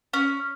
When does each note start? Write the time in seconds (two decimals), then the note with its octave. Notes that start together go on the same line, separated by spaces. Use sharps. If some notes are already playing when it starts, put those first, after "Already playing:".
0.13 C#4